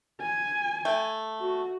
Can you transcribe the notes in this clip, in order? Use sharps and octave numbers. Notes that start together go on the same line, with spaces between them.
G#5
A3
F#4